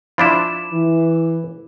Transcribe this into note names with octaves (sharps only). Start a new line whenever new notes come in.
F3 D4 E4 B5 D6 E7
E3